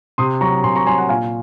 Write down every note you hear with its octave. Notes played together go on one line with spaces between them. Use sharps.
C3 C6 D#6
F#3 A#5 C#6
C3 G#5 C6
A#5 C#6
F#3 G#5 C6
F#5 A#5
A#2 F5 G#5